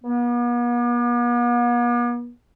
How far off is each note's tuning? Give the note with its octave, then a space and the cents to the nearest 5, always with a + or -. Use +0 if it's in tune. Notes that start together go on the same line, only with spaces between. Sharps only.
B3 -45